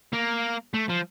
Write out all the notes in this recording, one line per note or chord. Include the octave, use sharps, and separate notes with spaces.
A#3
A3
F3